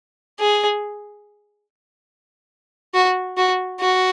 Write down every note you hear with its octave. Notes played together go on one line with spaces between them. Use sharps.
G#4
F#4
F#4
F#4